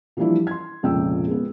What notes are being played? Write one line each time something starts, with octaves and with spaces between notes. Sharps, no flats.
E3 F3 G3 A#3 D4 E4
C6 G#6
F1 C#2 A#2 G5 E6
G#3 B3